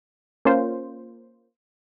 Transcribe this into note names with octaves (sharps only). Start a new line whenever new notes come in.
A#3 C#4 F4 C5